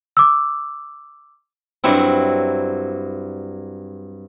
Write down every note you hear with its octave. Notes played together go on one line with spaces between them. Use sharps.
D6 E6
G2 F#3 C4 E4